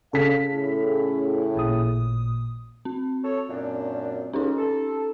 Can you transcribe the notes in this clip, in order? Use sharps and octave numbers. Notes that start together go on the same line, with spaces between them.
C#3 A4 F5 B6
A2 E4 G#4
A1 A#2 D#6
C4
A4 C#5
F#2 A#2 D4
C#2 C#4 D#4
A4